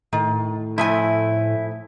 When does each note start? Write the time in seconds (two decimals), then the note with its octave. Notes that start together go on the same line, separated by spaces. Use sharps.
0.13 A2 D#3
0.78 F3 A3 E4 G#5